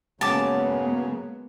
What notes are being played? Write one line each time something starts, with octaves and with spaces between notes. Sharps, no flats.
C#3 F#3 G#3 A#3 B3 A5 D6